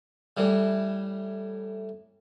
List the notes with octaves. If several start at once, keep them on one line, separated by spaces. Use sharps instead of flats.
A2 E3 G3